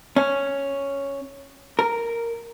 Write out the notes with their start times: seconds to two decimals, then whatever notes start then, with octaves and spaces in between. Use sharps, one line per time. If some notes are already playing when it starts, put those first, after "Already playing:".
0.16 C#4
1.79 A#4